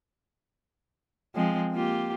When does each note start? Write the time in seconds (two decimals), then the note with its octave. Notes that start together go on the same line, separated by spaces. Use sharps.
1.35 F3 G#3 C4
1.73 A#3 F4 G4